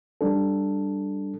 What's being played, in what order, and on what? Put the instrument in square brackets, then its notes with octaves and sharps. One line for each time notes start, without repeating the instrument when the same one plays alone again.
[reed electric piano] G3 D4 A4